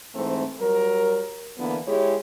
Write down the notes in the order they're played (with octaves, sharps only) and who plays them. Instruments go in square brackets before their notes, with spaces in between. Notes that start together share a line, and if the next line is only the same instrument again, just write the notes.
[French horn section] G#2 E3 A3 C4
F#3 G3 A#4
D3 E3 A#3 B3
G#3 E4 G4 G#4 C#5